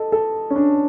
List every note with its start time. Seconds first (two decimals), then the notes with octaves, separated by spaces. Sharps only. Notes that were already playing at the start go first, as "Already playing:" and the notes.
Already playing: A4 D#5
0.12 A4
0.50 C#4
0.56 D4